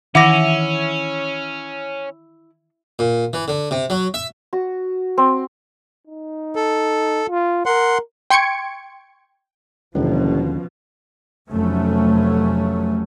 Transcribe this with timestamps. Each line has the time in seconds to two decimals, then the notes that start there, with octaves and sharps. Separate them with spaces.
0.15 D#3 E3 C#4 E4 F#5 D6 A#6
2.99 A#2
3.33 E3
3.48 D3
3.71 C3
3.90 F#3
4.14 E5
4.53 F#4
5.17 C4
6.07 D#4
6.55 A4
7.28 F4
7.66 A#4 F#5 C6
8.30 G5 C6 C#6 G#6 C#7 D7
9.95 F#1 D#2 B2 D3 F3 G#3 C#4
11.49 F1 F#3 A3 C#4